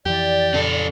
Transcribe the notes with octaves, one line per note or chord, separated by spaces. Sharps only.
F2 E3 G4 D5
F2 C#3 C#4 A4